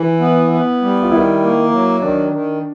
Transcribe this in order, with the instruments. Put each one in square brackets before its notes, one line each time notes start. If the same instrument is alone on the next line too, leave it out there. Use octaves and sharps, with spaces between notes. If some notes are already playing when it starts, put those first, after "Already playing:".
Already playing: [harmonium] E3 [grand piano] E4
[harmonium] B3
B3
G3
[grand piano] F4
[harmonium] D#3 [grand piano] E4
[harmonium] A#3
F#3
[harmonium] D#3 [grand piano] D4
[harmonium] D#3